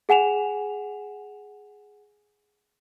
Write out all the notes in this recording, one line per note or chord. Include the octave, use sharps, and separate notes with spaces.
G#4 F#5 G#5 E7 F7